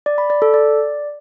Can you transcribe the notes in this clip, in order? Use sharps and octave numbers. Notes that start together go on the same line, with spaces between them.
D5
B5
D5
A4
D5